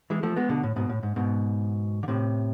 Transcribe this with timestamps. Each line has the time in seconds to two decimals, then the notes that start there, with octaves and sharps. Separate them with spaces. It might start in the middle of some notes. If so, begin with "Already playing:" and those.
0.10 E3 G#3
0.23 F3 A3
0.36 G#3 B3
0.49 B2 D3
0.63 A2
0.76 G#2 B2
0.89 A2
1.03 G#2
1.16 G#2 B2
2.03 D3
2.08 A2 C3